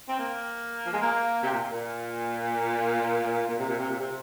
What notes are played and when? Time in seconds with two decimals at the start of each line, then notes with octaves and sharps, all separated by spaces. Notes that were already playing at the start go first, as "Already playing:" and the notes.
0.09 C4
0.20 A#3
0.87 F3
0.94 G#3
1.01 A#3
1.43 C3
1.52 A#2
1.72 A#2
3.50 A#2
3.60 C3
3.69 A#2
3.80 C3
3.90 A#2
4.00 C3